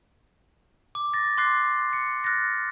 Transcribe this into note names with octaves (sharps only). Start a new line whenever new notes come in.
D6
A6 A#6
C6 D6 F#6 C7
C#7
F6 F#6 A6 A#6